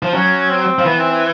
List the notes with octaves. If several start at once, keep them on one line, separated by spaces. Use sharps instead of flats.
F3
F#3 C#4
C4
F3
E3 B3
C4
C4